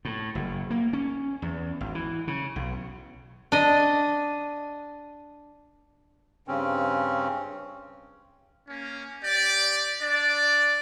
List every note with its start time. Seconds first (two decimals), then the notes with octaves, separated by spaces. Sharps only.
0.05 A2
0.35 F#1
0.70 A#3
0.93 C#4
1.42 E2
1.81 G#1
1.95 E3
2.27 C#3
2.56 B1
3.52 D4 D#5
6.48 G2 C#3 C4 C#4
8.69 A#3 C#4
9.24 G4 D5
10.02 D4 D5